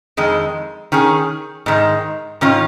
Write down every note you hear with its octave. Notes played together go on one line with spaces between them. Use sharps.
F2 D#3 G#3
D#3 C#4 G#4
G#2 D#3 G#3
G#2 D#3 C#4 F4